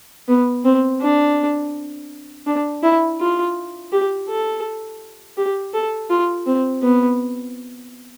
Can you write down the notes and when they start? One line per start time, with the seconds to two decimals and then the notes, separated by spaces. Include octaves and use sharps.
0.28 B3
0.65 C4
1.01 D4
2.47 D4
2.83 E4
3.20 F4
3.92 G4
4.28 A4
5.37 G4
5.74 A4
6.10 F4
6.46 C4
6.82 B3